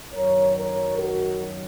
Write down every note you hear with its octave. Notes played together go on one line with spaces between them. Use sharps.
F#2 D#3 F#3 A#4 C#5
A#4 C#5
F#4 A#4